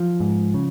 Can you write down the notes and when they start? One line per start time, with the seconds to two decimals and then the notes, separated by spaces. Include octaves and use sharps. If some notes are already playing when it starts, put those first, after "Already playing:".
Already playing: F3
0.20 G#2
0.54 C#3